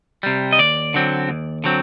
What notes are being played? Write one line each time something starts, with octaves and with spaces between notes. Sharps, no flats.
C3 G3
D#5
D#2 D5
D3 F#3 C4
D#2
D3 F#3 C4